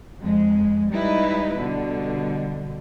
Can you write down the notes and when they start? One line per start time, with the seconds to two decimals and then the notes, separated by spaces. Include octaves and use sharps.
0.20 F2 G#3
0.90 G3 G#3 D#4 E4 B4
1.56 B2 D3 G3